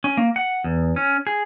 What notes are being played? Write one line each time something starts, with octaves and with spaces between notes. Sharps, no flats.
C#4
A#3
F#5
E2
C#4
G#4